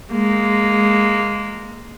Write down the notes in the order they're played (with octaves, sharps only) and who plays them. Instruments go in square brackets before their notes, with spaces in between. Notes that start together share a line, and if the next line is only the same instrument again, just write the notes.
[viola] G#3 A#3